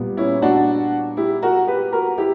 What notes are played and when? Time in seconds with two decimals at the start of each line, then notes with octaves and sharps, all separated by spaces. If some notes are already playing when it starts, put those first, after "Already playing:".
Already playing: A#2 G3 B3
0.17 C#4 E4
0.42 D4 F#4
1.17 E4 G4
1.42 F#4 A#4
1.67 G4 B4
1.93 F#4 A#4
2.18 E4 G4